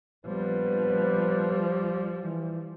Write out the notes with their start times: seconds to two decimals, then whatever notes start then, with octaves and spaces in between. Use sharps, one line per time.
0.26 A#1 F3 G3 B3 B4
2.23 E3